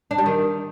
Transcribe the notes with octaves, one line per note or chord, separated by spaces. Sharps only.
D4
G3
D#3